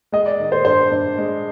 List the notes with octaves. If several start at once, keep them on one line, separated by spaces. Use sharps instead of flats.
G#3 D#5
D5
D#3
C5
G2 C5
G2
G#3